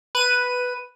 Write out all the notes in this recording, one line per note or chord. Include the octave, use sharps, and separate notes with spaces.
B4 D#7